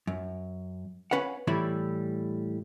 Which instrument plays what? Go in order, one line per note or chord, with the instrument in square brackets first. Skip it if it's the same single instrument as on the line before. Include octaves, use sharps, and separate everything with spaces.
[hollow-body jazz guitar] F#2
C#4 B4 F5 F#5
A2 E3 G3 E4 B5